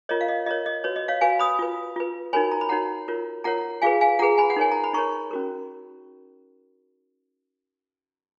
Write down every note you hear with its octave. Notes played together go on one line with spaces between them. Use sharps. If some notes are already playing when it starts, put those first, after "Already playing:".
F4 A#4 C#5 D#5
F5
D#5
F4 A#4 C#5 D#5
D#5
F#4 B4 C#5
D#5
C#5 F5
F#4 B4 F5 G#5
B5 D#6
F4 B4
F4 B4
D#4 F#4 A#4 C#5 G#5 B5
A#5
B5
D#4 F#4 A#4 C#5 F#5 A#5
F4 A#4 C#5
F4 A#4 C#5 F#5 A#5
F4 G#4 B4 F5 G#5
F5 G#5
F4 G#4 B4 F#5 A#5
G#5 B5
F#5
D#4 A#4 C#5 G#5
A#5
B5
D#4 A#4 C#5 A#5 C#6
C#4 F#4 A#4